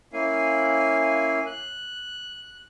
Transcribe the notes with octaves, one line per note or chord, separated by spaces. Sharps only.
A#3 C#4 E4 F5 G#5
F#6